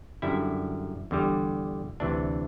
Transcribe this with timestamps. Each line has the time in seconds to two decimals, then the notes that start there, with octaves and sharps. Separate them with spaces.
0.22 F#2 D3 G3 E4
1.11 E2 D3 G3
2.00 D2 C3 E3 D4